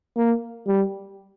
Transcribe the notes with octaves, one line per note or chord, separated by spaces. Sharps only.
A#3
G3